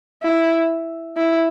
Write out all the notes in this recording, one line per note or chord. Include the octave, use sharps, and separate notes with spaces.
E4
E4